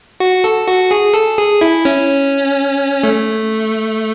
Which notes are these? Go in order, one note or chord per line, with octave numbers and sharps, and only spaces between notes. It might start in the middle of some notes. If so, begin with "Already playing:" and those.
F#4
A4
F#4
G#4
A4
G#4
E4
C#4
A3